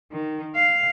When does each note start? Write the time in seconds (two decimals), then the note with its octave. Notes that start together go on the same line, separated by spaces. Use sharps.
0.12 D#3
0.55 F5